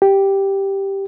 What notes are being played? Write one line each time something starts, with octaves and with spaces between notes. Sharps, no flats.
G4